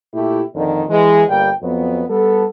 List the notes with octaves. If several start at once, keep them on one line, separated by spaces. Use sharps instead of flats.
A#2 A3 E4 G4
F2 A#2 D3 D#3
E3 G#3
G1 G3 A#3 G5
F2 F#3 B3
G3 B3 A4